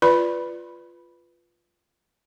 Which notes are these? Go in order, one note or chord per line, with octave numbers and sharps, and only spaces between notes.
F4 B4 D5 B5